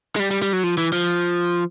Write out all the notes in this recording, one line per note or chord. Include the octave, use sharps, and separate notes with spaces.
G#3
G3
G3
G3
F#3
F3
E3
F3